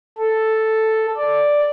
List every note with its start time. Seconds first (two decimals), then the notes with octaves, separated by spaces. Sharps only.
0.18 A4
1.17 D5